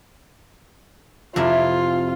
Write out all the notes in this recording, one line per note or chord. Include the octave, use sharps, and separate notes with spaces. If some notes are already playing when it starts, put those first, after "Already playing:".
F2 C3 E4 F4